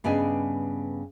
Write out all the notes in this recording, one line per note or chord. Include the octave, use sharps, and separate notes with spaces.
G2 C#3 B3 D4 D#5 G#5